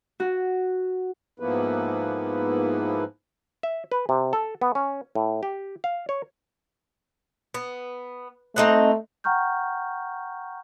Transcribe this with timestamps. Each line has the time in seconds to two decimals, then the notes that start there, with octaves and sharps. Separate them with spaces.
0.20 F#4
1.40 G#2 F3 A#3 B3 E4 B4
3.63 E5
3.92 B4
4.09 C3
4.33 A4
4.61 B3
4.75 C#4
5.15 A2
5.43 G4
5.84 F5
6.09 C#5
7.54 B3
8.56 A3 C4 D#4 F#5
9.24 F#5 G5 A#5 C#6 F6 G6